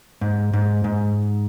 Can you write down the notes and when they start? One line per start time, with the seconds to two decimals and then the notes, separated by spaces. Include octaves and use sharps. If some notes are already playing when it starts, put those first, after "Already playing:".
0.21 G#2
0.53 G#2
0.84 G#2